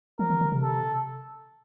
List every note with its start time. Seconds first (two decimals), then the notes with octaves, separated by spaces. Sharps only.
0.19 F3 A#4
0.30 D#3
0.41 D3
0.52 C3
0.62 A4